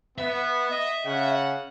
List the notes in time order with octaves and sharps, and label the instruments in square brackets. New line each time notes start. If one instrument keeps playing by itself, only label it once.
[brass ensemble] B3 [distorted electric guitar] E5
[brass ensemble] D#5
C#3 F#5